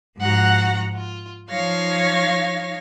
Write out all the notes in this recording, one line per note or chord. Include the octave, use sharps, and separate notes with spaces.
G#2 F3 F#4 F#5 A#5
F4
F3 D#4 C#5 F5 A#6